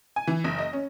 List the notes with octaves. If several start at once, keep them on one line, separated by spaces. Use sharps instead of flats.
G#5
E3
F#1
D#5
C#4